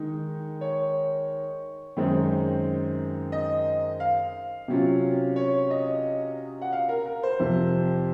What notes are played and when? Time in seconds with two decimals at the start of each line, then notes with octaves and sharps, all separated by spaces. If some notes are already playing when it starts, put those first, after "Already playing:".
Already playing: D#3 G#3 D#4
0.61 C#5
1.97 F#2 D#3 G#3 C4 D#4
3.32 D#5
4.00 F5
4.68 C3 F#3 C#4 F4
5.36 C#5
5.70 D#5
6.62 F#5
6.73 F5
6.89 A#4
7.06 A#4
7.23 C5
7.40 F2 C3 F3